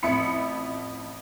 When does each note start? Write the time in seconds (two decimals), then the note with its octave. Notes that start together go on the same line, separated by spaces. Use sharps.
0.03 A1 F2 E5 B5 C#7